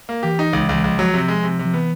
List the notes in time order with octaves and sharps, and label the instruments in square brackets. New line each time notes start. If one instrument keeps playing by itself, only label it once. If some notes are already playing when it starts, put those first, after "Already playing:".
[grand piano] A#3
[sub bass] E3 [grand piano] G4
[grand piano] D#4
C#2
[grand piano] C#2 [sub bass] E3
[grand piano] C#2 [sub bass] F3
[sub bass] F3 [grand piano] F#3
[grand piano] C3
G#3
C3
C3
[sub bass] F3
[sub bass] E3 [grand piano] B3